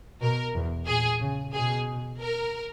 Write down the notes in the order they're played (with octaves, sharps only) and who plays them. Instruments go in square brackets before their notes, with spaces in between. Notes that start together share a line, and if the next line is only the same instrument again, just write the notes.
[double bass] B2 [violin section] A#4
[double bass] E2
[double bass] A#2 [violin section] G#4
[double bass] C#3
[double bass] B2 [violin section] G#4
[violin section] A#4